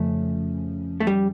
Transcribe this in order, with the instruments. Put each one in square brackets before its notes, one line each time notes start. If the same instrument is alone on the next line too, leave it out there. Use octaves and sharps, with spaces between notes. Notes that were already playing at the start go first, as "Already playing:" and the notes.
Already playing: [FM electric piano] F2 C#3 F3 C#4 [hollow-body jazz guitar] A3
[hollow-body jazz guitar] A3
G3